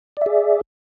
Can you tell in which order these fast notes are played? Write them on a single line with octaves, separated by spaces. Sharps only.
D5 E5 G#4